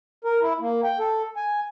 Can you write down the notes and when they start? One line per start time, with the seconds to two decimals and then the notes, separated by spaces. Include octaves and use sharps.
0.25 A#4
0.41 E4
0.60 A#3
0.84 G5
0.99 A4
1.37 G#5